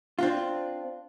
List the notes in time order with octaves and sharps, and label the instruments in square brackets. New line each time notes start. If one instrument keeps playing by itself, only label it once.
[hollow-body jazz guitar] C4 D4 F4